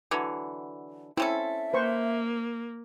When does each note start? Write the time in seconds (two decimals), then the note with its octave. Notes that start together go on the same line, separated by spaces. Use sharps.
0.11 D3 E3 F#3
1.17 C4 C#4 E4 A4 E5
1.73 A#3 B4 C5 C#6